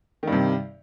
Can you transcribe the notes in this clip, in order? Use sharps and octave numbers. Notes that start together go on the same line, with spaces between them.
G2 C3 D#3